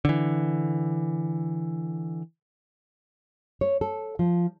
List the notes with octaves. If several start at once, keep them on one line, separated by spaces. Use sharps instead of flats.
D3 E3
C#5
A4
F3